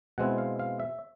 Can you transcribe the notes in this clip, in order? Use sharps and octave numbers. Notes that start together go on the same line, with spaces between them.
B2 G#3 C4 E4 F#5
F5
F5
E5